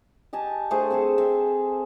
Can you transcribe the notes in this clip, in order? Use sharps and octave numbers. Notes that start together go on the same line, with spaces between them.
G4 D#5 G#5 A5
A3 D4 G#4 C5
C4 G#4 A4
C4 E5